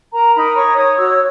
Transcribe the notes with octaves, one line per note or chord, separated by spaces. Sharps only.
A#4 A#5
D#4 B5
C#5 C#6
C#5 D#6
F#4 E6